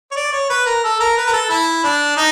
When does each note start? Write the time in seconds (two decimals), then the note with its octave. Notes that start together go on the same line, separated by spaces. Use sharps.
0.11 C#5
0.16 D5
0.32 C#5
0.50 B4
0.66 A#4
0.84 A4
1.00 A#4
1.17 B4
1.27 A#4
1.33 A4
1.49 E4
1.84 D4
2.17 D#4